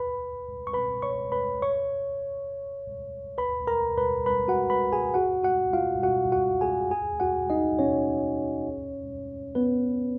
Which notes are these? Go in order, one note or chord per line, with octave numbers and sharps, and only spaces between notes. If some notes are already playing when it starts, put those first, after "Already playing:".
Already playing: B4 B5
C#6
B4 B5
C#5 C#6
B4 B5
C#5 C#6
B4 B5
A#4 A#5
B4 B5
B4 B5
F#4 F#5
B4 B5
G#4 G#5
F#4 F#5
F#4 F#5
F4 F5
F#4 F#5
F#4 F#5
G#4 G#5
G#4 G#5
F#4 F#5
D#4 D#5
C#4 C#5
B3 B4